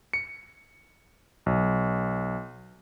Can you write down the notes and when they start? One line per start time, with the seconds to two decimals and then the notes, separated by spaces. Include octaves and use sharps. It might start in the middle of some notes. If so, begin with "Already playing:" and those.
0.13 C#7
1.46 B1